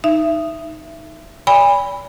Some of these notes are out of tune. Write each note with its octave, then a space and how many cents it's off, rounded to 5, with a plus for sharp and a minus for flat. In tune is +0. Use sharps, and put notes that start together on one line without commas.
D#4 +0 E5 +25
D5 -45 G#5 -40 B5 +0